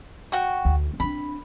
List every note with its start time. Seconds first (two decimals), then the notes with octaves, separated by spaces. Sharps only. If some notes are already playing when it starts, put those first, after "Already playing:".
0.32 F#4 G5 C#6
0.65 D2
1.00 C4 D4 B5